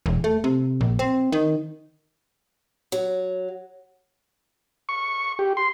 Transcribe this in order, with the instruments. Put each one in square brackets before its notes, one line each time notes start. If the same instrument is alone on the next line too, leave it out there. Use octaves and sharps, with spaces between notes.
[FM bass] E1
A3
C3
A#1
C4
D#3
[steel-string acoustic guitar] F#3
[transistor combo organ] C#6
G4
C6